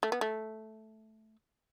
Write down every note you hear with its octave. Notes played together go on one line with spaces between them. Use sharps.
A3
B3
A3